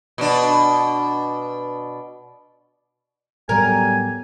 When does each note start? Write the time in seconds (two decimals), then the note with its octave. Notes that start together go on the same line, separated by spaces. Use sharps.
0.18 B2 D4
3.49 A2 F#3 G3 B3 A#4 G#5